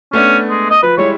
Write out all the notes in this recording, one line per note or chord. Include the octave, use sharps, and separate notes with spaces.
A3 B3 C#4 D4
G#3
D#5
F3 B4
G3 G#3 E4 C#5